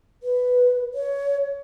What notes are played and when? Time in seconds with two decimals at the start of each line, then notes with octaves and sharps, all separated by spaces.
0.23 B4
0.94 C#5